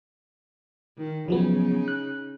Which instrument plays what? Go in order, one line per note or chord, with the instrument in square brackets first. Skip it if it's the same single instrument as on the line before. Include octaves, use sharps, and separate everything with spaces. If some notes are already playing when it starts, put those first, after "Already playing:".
[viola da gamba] D#3
[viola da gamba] C#3 D#4 [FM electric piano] F3 F#3 B3
[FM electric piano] F#6